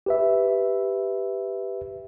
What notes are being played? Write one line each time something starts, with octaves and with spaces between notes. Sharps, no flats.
G4 B4 E5